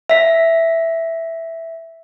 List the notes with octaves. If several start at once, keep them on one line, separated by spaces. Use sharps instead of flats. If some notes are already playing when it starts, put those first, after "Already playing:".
E5 B6